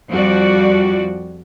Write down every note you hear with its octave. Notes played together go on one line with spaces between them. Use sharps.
F2 F3 G3 F#4 D5